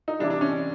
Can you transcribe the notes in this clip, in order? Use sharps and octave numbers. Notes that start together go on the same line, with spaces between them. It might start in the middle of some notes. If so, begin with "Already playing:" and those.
D#4
C3 E3 G3 D4
D4
C#4